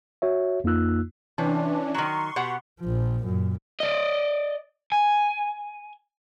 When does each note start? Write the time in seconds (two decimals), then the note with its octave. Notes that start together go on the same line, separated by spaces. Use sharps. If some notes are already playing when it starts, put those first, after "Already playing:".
0.22 F#4 C#5 E5
0.64 F2 A#3 D#4 F4 E6 F#6
1.38 C3 E3 C#4 D4
1.94 D#3 F#3 C6 C#6
2.36 B2 G4 F#5
2.80 A#1 F3
3.24 F#2 A#2
3.80 D5 D#5
4.92 G#5